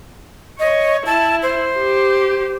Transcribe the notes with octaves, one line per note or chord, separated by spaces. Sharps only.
C#5 D#5
E4 A5
C5
G4